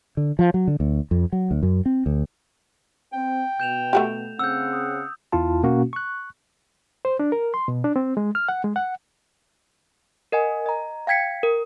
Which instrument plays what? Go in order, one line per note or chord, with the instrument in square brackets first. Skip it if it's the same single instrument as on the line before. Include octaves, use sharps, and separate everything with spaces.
[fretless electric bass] D3
F3
F#3
D3
D2
F2
F#3
D2
F#2
C4
D2
[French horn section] C4 [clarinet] G5
[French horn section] B2 [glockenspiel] G6 E7 F7
[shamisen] A3 F#4 G4
[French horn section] C#3 C4 [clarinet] F#5 [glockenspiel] E6 G6
[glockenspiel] D#6
[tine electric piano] E2 E4 F4 A5
B2 A#3 C#4 F#4
C#6 F#6
[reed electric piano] C5
D4
A#4
C6
B2
D4
C4
G#3
F6
F#5
G#3
F#5
[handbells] A#4 D#5 F#5 G#5
D#5 A#5
F5 G5 G#6 B6 C#7
A#4